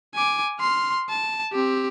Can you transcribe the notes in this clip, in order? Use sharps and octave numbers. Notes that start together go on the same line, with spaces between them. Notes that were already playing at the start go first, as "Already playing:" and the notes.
G#5 D6
C6 F6
A5
C4 G4